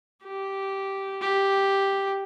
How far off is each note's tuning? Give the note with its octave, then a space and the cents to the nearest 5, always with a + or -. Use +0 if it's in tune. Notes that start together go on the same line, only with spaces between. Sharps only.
G4 -10
G4 +0